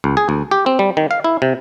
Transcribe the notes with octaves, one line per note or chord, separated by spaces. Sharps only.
C#2
G#4
D2
G4
C4
G3
D#3
F5
E4
C3